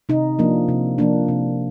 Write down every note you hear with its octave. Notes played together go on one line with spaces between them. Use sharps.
C3 D#4
F3 A#3 D4
C3
F3 A#3 D4
C3